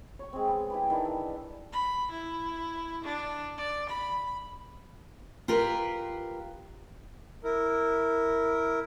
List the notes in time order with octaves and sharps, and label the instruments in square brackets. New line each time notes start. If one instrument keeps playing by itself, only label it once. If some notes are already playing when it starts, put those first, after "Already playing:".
[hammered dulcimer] C#5 C#6
G#3 C4
B3 G#4
E4 G4 B4
D#3 E3 D4
E5
[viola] B5
E4
D4
D5
B5
[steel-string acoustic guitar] F4 G4 A#4 B4
[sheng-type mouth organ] E4 A#4